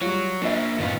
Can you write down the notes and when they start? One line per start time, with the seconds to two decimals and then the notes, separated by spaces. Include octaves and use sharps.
0.01 F#3 G3 F4 C#5
0.42 F3 A#3 D4 E5
0.79 A1 D#3 B3 F4 B6